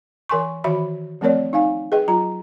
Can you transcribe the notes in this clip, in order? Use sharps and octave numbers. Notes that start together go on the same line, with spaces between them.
E3 A#4 G#5 C6 C#6
D#3 E3 F#4 E5 B5
F3 A3 C4 A#4 C#5 D5
D#4 F5 G#5
G#4 B4 D#5 G5
F#3 F4 A#5